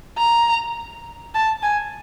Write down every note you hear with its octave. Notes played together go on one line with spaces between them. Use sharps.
A#5
A5
G#5